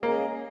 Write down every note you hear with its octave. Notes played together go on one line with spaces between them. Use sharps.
G#3 A#3 C#4 G#4 D#5